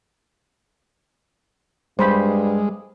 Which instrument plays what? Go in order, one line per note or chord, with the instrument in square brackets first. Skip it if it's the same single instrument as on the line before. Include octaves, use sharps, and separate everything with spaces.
[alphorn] G2 [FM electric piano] G3 [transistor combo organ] G#3 [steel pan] C5 B5